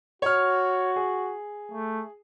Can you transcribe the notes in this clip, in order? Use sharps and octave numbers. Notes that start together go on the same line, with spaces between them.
F#4 C#5 F6
G#4
A3